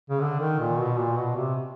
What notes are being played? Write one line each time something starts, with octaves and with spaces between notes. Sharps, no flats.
C#3
D3
D#3
A#2
B2
A#2
B2
C3